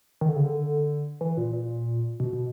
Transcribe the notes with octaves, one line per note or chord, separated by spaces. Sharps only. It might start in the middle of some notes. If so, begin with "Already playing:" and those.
D#3
D3
C#3
D3
E3
A#2
A#2
B2
B2